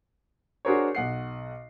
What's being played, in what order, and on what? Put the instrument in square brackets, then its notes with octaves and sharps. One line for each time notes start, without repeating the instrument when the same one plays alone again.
[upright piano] D4 F#4 G#4 A#4 C5 C#5
B1 F#5 C7